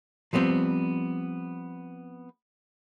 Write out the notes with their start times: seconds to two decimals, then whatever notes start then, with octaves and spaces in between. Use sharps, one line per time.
0.33 F3 G3 B3 C4